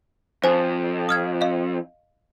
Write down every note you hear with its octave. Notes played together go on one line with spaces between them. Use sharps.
F2 C5 G#5
D#6 F6 G#6
D#5 F5